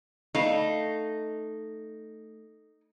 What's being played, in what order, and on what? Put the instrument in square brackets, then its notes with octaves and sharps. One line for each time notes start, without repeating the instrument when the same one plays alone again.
[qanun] A3 F5 [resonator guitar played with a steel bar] D#4